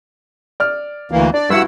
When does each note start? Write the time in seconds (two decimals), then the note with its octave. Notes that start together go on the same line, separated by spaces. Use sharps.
0.60 D5 F6
1.12 D2 E3 A#3
1.34 D4 D5
1.50 G2 E4 F#4 F#5 E6